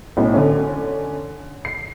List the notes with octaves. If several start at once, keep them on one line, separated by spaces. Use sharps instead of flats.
B1 A2 C#4
D3 C#4
C7